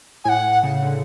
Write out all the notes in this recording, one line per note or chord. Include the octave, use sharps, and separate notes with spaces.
A2 F#5 G#5
C#3
D3